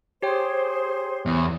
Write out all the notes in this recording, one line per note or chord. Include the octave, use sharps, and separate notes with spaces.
G4 G#4 C5 C#5 G5
E2